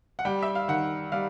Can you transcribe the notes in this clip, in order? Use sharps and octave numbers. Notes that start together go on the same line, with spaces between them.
F#5
G3 G5
E5
F5
D#3 F#5
G3 F5